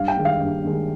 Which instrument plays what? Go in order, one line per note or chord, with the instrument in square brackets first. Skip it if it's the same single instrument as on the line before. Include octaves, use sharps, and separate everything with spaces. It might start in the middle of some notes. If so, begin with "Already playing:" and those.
Already playing: [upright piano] G2 F5
G5
D#3 G#3
F5
G2
D#3 G#3